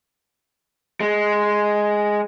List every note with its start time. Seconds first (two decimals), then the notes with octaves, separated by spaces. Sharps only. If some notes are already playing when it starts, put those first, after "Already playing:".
1.00 G#3